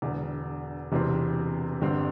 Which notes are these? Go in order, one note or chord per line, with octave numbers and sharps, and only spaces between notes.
E1 E2 D3
E1 E2 C3 E3 C4
G1 G2 D3 C4